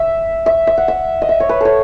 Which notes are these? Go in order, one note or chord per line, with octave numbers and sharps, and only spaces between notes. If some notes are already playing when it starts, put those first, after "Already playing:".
Already playing: E5
E5
E5
F#5
E5
D#5
E5
C#5
B4
A4 C#5